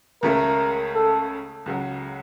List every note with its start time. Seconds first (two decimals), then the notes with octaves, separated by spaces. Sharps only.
0.23 C#2 C#3 A3 A#4
0.95 A4
1.66 C#2 C#3 F#3